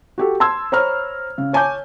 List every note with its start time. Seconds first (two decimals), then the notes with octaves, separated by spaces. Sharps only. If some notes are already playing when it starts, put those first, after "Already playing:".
0.18 F#4 G4 A4
0.40 A5 C6 E6 G#6
0.72 C5 C#5 A#5 B5 F6
1.38 C#3
1.53 C#5 G#5 A5 D6 G6